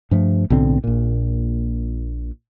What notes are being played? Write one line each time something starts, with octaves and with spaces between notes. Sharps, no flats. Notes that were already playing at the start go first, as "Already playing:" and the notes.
G2 F3 A3
B1 A2 D3 C4
A#1 A#2